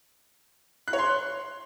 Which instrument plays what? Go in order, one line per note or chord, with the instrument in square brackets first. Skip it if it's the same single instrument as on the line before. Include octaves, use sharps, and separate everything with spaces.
[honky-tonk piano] F#6
C#5
C6